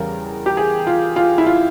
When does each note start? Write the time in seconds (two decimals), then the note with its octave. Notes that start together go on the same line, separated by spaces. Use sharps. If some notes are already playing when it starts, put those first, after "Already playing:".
Already playing: E2 C#3 G3 A#4
0.46 G4
0.57 G#4
0.87 F4
1.16 F4
1.38 E4
1.46 F4